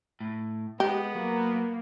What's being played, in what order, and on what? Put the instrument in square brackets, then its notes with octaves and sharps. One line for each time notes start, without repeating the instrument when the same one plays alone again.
[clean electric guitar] A2
[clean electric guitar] G#3 [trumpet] B3 [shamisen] G4
[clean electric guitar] F#3 [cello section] A#3